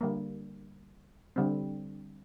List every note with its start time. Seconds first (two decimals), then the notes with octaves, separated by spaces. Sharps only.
0.01 D3 G3 A#3
1.36 D3 G3 C4